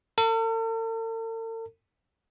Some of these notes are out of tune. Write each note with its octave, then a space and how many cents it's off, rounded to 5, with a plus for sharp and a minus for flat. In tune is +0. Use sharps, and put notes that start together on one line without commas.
A4 +45